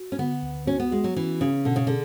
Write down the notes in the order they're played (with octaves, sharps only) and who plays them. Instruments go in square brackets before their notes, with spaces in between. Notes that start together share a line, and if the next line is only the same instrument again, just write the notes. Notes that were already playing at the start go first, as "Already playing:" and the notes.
Already playing: [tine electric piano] F#4
[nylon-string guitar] C#4
[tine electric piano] D3 [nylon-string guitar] B3
[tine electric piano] D2
[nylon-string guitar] C#4 [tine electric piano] F#4
[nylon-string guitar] B3
[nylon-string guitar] G#3 [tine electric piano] F#4
[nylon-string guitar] F#3
[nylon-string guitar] E3 [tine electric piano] C#4
[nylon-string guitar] C#3 [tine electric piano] C#4
[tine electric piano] B2 [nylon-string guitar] D3
[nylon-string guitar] C#3
[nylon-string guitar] D3 [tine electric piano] G#4